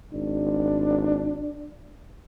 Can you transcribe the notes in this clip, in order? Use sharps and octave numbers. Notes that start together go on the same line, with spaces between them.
G#1 D4